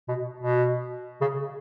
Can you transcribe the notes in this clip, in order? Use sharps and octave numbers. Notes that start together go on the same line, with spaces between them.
B2
B2
C#3